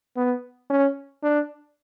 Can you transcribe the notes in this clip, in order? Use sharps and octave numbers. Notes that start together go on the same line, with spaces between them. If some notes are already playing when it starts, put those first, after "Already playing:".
B3
C#4
D4